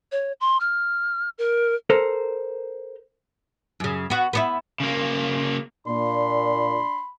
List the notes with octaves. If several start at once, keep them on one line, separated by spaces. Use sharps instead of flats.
C#5
C6
F6
A#4
A4 A#4 C5
F#2 C#3
B3 F#4
B3 D4 E4
C#3 A#3
A#2 D4 B5 C6